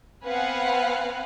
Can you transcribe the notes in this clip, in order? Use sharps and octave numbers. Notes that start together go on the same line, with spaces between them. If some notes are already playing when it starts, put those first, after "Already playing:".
B3 C4 B4 F5 F#5 G#5